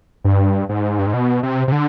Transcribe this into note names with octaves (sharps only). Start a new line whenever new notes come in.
G2
G#2
G2
G#2
B2
C3
C3
D3